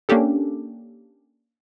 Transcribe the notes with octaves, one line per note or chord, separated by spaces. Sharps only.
A#3 C#4 D4 G4 A4